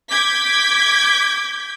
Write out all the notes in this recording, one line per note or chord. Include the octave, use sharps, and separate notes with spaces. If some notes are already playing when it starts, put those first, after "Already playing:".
D6 G6 G#6 B6